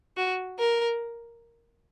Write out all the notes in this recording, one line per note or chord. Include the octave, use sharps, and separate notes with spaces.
F#4
A#4